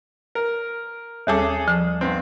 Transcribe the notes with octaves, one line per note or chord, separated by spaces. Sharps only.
A#4
D#2 G3 C#4 G#4 A4 D6
F3
G2 B3 C4